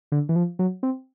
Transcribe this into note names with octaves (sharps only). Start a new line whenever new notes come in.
D3
E3
F3
F#3
C4